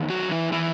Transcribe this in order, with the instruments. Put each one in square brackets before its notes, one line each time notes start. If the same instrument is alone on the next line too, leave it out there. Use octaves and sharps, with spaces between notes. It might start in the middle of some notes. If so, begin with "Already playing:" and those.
Already playing: [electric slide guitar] E2 D#3
F#3 F#4
E3 E4
E3 E4